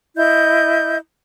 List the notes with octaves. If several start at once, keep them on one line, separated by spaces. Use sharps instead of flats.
E4 D#5 G6